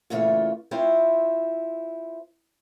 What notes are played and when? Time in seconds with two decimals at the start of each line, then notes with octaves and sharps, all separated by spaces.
0.10 A#2 C#3 E3 A3 F4 C#5
0.71 C4 E4 F4 C5 C#5